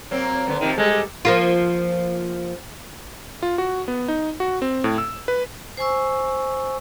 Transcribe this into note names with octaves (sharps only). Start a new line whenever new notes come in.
F#3 A#3 C4
F#2 D3 B3
C3 D#3 F3 A#3
G3 G#3 G4 A4
F3 A#3 F4
F4
F#4
B3
D#4
F#4
C4
A2
E6
B4
C5 G#5 C#6 E6